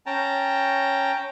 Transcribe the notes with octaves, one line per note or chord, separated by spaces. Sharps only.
C#4 G5 A5 A#5